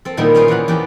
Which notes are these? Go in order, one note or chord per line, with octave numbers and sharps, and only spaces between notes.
C4 A4
A#2 D#3 G3 A#3 B3 E4
C#4 F4 G#4 C5 F5 G5
E2 E3 A#4 B4 F#5 B5
E2 G4 D5 G5 A5